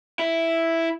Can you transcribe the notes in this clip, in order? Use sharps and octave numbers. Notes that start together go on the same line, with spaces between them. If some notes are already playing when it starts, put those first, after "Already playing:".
E4